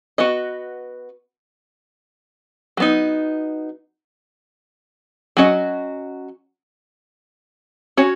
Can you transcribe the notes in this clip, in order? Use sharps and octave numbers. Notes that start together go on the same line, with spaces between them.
B3 F#4 B4 D#5
F#3 B3 D#4
F#3 C#4 F#4 D#5
C#4 F#4 C#5